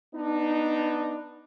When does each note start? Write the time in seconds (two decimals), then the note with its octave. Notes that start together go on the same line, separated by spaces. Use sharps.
0.16 B3 D4 D#4